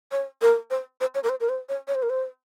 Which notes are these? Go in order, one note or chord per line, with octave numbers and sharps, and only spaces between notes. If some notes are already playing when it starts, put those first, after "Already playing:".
C#5
A#4
C5
C5
C#5
A#4
C5
A#4
C5
C#5
C#5
C5
A#4
C5